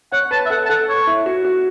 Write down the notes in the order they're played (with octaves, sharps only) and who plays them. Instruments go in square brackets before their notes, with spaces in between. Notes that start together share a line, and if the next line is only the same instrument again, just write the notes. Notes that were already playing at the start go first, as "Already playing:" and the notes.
[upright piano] C#5 [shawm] F#5
[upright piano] B4 [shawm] A5
[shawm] E5
[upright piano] A4 [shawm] F#5
[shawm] A5
[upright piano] A4 [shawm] F#5
[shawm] C#5
[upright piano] E4
F#4
F#4